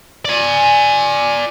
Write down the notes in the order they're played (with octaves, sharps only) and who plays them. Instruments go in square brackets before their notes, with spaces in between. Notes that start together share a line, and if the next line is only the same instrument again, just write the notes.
[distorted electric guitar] D5 G#5